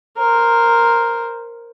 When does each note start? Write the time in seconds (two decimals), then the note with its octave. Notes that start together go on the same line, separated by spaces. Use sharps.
0.17 A#4 C5